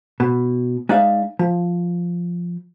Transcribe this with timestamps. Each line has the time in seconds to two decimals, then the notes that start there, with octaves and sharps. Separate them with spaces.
0.20 B2
0.89 G#3 D#4 D5 E5 F5
1.39 F3